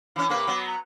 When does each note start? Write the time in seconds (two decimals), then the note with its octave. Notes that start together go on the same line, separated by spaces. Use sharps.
0.16 E3 C#4
0.29 C3 A#3 B4 D6
0.47 F#3 B3
0.67 A#5